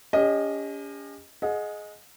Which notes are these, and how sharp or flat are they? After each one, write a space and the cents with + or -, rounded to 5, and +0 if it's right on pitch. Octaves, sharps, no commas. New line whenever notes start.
C#4 +35 G4 +45 D#5 +0
G#4 +20 D#5 +0 F#5 -40